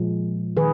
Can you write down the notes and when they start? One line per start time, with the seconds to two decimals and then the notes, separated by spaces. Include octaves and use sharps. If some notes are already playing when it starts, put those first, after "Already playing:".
Already playing: A#2 F3 G#3
0.57 D#3 G#4 B4